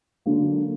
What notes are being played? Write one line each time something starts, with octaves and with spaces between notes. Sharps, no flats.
D3 F#3 A#3